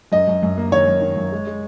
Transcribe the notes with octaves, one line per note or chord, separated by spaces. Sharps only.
F#2 D#5
F#2
F#2
A#3
D#3 C#5
F#2
D#3
F#2
G#3
G#3